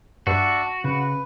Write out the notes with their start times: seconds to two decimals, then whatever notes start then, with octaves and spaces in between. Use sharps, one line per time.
0.27 G2 D4 F#4 E5 A5
0.84 C#3 B4